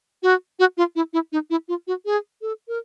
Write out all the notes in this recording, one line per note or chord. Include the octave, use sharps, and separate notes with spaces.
F#4
F#4
F4
E4
E4
D#4
E4
F4
F#4
G#4
A4
A#4